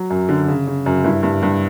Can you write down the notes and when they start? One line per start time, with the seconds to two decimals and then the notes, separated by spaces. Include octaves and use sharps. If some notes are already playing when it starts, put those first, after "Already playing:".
Already playing: F#3
0.10 F#2
0.29 D3
0.48 C#3
0.67 C#3
0.86 F#2
1.04 G2 E4
1.23 G2
1.43 G2